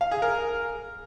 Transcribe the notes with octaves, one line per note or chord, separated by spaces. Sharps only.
F5
G#4
A#4